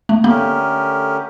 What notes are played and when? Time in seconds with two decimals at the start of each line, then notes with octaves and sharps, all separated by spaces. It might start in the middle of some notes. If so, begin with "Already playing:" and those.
0.09 A3
0.24 D3 A3 A#3 C#4 G4 A#4